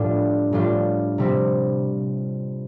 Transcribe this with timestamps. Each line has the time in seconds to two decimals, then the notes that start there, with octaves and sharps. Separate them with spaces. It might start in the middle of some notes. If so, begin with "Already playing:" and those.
Already playing: A2 G3 D4 F4
0.53 A2 G3 D4 F4
1.18 C3 G3 C4